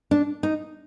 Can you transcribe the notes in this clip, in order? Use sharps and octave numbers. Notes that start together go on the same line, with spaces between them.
D4
D#4